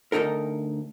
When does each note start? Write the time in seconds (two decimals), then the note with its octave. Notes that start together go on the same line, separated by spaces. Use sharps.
0.12 D2 C#3 D#4 A4 A#4